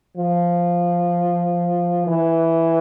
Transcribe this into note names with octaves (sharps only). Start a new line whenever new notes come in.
F3
E3